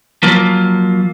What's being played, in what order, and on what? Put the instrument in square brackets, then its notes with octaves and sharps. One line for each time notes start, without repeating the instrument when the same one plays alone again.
[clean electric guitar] F3 F#3 A#3 F4